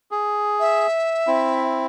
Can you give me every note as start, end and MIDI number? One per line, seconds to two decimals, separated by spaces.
0.11 0.87 68
0.60 1.60 76
1.27 1.87 60
1.27 1.87 64